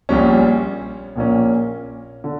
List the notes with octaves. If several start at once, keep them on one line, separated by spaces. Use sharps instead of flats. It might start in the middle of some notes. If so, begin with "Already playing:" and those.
A#1 A#2 G3 C#4
A#1 A#2 A#3 C#4
D3